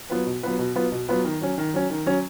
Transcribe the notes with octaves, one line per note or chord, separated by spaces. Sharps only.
F#3 B3 F4 B4
B2
F#3 B3 F4 B4
B2
F#3 B3 F4 B4
B2
F#3 B3 F4 B4
D#3
F#3 C#4
D#3
F#3 C#4
D#3
F#3 C#4